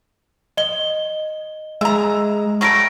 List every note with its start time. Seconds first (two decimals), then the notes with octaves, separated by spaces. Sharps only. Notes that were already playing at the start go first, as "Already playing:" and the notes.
0.57 D#5 G7
1.81 G#3 E5 A#5
2.61 F#3 G3 A3 C#6 A#6 D7